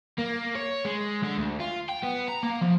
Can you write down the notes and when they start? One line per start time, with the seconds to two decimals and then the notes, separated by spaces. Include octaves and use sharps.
0.19 A#3
0.55 C#5
0.85 G#3
1.23 D3
1.38 D2
1.60 F4
1.89 G5
2.03 B3
2.28 A#5
2.43 A#3
2.61 F3